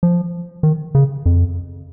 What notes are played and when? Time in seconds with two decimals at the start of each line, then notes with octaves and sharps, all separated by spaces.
0.03 F3
0.63 D#3
0.95 C#3
1.26 F2